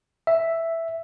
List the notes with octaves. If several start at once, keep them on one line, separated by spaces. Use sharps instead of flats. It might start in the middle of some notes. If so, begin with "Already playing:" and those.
E5